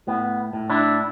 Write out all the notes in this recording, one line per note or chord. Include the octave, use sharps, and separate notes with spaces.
A2 B3
A2
D4 E4